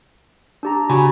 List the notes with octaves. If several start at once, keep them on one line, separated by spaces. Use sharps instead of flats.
D4 G4 A#5
C#3 F#4 G#5 B5